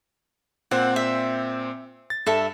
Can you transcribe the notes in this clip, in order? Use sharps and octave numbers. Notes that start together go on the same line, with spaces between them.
A#2 C4 C5 F#5
E5
A6
G2 A4 E5